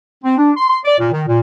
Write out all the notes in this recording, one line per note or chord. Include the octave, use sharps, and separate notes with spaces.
C4
D4
C6
C6
D5
A#2
D#3
A#2